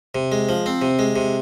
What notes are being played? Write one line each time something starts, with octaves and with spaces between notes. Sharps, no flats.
C3
G#3
F3
C4
C3
G#3
C3